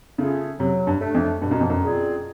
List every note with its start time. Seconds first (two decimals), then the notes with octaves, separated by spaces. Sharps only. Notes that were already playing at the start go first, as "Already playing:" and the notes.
0.18 C#3 A3 C#4 F4 G#4
0.59 C3 F#3
0.87 G2
1.00 A3 D4
1.15 F2
1.42 G2 B2
1.51 F#2
1.60 F2
1.70 F#2
1.82 G3 C4 F4 G#4